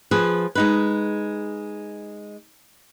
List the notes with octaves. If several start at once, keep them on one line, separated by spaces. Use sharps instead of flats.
F3 G#4 B4
G#3 D#4 B4